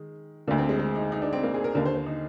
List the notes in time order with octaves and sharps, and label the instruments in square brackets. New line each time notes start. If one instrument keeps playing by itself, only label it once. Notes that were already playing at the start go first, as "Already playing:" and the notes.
Already playing: [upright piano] D#3 G#3
D3 A#3
D2
C4
G#3
G#3
D#4
D#4
D4
C4
A#3
G#4
A#4
D#2 D3 A#4
C5
C5
D#4